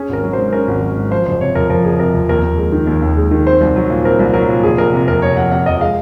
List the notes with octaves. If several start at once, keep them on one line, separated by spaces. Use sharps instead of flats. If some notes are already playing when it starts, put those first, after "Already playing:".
Already playing: C#4 G#4
G#1 A#4
F#3
C5
G#2
C#4 A#4
G#1
F#3
G#2
F3 C5
F#1 C5
C3 C#5
F2 A#4
F3 A#4
F#1 G#4
C3 A#4
F2
D#2 A#4
D#2
G#3
D#3
D#2
D#2
G#3
D#3
C4 C5
C2
F#3
A#2
C4 A#4
C2
F#3 A#4
A#2
F1 G#4
F1 A#4
C3
F2 A#4
F1 C#5
F1 F#5
C3 F#5
F2 D#5
G#3 F5